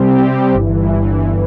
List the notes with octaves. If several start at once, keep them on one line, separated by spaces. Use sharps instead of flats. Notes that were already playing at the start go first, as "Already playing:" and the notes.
Already playing: C3 G3 C4 G4
C3 G3 C4 G4
G1 G2 E3
G1 G2 E3